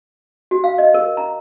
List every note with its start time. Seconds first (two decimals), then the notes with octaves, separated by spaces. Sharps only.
0.51 F#4
0.64 F5
0.78 D#5
0.94 A#4
1.17 A#5